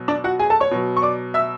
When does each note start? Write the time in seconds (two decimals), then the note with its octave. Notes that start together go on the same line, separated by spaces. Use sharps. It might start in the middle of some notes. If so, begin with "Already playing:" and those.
Already playing: B2 F#3
0.08 D4 D5
0.24 F#4 F#5
0.39 G#4 G#5
0.50 A4 A5
0.60 C#5 C#6
0.71 B2 F#3
0.97 C#6
1.02 D5 D6
1.34 E5 E6